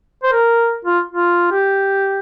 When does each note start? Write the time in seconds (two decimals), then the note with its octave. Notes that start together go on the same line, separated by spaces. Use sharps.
0.23 C5
0.32 A#4
0.85 F4
1.12 F4
1.51 G4